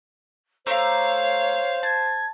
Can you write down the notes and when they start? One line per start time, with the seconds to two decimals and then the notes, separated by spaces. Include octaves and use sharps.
0.67 A3 C5 C#5 F5 A#5 D6
1.83 A5 G#6